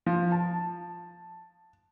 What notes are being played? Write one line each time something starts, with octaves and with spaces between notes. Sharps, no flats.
F3
A5